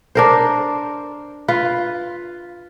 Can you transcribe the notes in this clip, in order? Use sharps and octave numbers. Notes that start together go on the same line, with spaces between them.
D4 A#4 C5
F4 B4